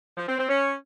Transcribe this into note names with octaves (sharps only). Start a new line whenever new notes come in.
F3
C4
C4
C#4